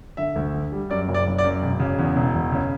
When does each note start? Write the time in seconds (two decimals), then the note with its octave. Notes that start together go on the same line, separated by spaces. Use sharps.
0.17 D3 E5
0.36 D2
0.54 D3
0.72 G3
0.90 F#2 D5
1.08 F#1
1.14 D5
1.26 F#1
1.38 D5
1.44 F#2
1.62 E1
1.80 C#3
1.99 E2
2.16 E1
2.35 E2
2.52 C#3